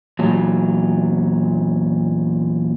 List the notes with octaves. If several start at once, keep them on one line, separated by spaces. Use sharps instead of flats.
E2 A#2 F#3